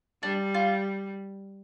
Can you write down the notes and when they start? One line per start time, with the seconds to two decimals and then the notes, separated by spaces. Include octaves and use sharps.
0.23 G3 D4
0.55 F4